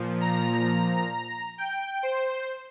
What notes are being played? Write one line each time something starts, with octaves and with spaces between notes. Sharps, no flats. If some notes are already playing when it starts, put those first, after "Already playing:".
Already playing: A#2 F3
A#5
G5
C5